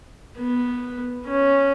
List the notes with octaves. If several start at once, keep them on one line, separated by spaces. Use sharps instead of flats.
B3
C#4